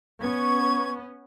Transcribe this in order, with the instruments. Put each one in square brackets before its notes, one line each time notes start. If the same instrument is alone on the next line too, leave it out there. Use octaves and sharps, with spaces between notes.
[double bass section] B3 C#4 [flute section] C#6 G#6